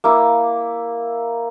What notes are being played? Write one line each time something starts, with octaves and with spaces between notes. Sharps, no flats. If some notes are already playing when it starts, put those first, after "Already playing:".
A#3 E4